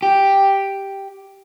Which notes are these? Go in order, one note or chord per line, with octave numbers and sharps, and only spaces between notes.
G4